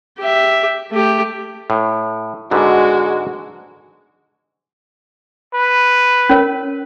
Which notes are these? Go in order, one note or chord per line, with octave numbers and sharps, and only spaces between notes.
G4 E5
A3 G4
A2
G#2 D3 G#3 B3 F#4
B4
C#4 A#4 C#5